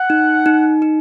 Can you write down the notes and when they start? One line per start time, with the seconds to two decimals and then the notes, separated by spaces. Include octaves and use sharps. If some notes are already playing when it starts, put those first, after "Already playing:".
Already playing: F#5
0.10 D#4
0.46 D#4
0.82 D#4